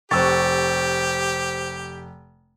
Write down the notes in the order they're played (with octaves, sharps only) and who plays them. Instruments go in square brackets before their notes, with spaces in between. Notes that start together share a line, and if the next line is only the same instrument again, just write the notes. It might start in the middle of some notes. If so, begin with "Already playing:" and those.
[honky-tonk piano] F1 C#6 [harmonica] G4 [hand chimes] C5 E6 A6